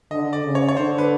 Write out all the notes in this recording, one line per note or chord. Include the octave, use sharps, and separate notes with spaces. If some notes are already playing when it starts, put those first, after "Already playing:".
D3 D#5
D5
C#3
C#5
C#5
D3 C5
B4